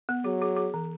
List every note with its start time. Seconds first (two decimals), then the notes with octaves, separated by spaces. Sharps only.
0.09 B3
0.24 F#3 G#4
0.42 G#4
0.57 G#4
0.74 E3